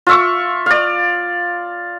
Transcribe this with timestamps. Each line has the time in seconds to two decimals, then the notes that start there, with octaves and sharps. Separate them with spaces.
0.07 F4 E5 C#6
0.66 D5 F5